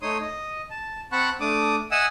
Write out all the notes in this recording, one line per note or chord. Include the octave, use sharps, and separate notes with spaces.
A3 D#4 C#5 C6 D#6
D#5
A5
C4 F#5 A5 B5 C#6 F#6
A3 D4 D6 D#6
D#5 E5 F#5 G#5 D#6 E6